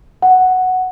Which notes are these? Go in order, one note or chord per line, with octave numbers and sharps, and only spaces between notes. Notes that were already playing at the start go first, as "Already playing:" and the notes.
F#5